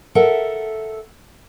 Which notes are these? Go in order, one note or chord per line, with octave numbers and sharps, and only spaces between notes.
A4 A#4 E5 F#5